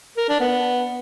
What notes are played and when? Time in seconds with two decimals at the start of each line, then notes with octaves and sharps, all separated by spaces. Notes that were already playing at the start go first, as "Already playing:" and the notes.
0.17 A#4
0.29 D4
0.40 B3